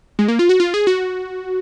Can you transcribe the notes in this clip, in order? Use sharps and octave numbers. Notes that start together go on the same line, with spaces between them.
G#3
A#3
F4
F#4
F4
G#4
F#4